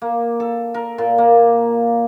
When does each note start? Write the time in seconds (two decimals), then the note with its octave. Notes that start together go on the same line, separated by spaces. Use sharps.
0.02 A#3
0.40 A4
0.74 A#4
0.98 A#2
1.18 A#3